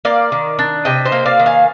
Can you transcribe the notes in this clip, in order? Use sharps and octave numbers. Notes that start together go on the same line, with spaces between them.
A#3 D5 F5
D#3
D4
C3 D#5 G5
C5 D#5
A#3
D5 F5
D#3
F5 G#5